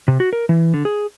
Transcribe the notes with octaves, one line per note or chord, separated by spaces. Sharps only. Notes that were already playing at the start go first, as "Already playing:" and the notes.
C3
F#4
A#4
E3
D3
G#4